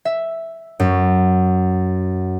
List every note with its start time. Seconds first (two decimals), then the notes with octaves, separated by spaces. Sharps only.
0.05 E5
0.80 F#2